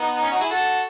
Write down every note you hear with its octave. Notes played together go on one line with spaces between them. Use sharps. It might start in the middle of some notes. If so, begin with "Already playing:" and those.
Already playing: B3 D#4
C#4
D#4 F#4
E4 G#4
F#4 A4